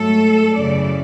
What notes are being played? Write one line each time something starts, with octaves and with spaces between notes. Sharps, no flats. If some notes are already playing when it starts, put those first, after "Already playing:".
Already playing: G#2 F#3 A3 A4
F#2 C#3 E3 D5